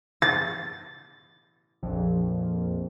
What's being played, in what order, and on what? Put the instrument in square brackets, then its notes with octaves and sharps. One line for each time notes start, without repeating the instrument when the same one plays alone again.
[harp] A6
[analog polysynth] A#1 F2